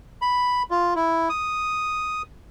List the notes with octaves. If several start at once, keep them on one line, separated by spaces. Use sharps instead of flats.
B5
F4
E4
D#6